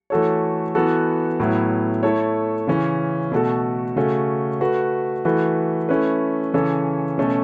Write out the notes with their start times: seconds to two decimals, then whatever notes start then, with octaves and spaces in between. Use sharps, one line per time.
0.10 E3 A3 F#4 A4 C#5
0.75 E3 B3 F#4 A4
1.40 A2 F#3 B3 E4
2.03 A3 E4 A4 C#5
2.67 C#3 E3 C#4
3.32 B2 A3 F#4 A4
3.96 C#3 A3 C#4 F#4
4.61 A3 F#4 B4
5.25 E3 A3 F#4 B4
5.89 A3 C#4 E4 B4
6.53 C#3 E3 C#4 A4 C#5
7.18 B2 A3 C#4 A4